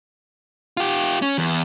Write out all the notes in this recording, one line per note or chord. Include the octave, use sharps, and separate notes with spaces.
F4 G4
C#4
E2